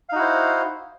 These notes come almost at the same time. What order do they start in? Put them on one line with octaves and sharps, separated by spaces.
F5 D#4 F#4 E4 C5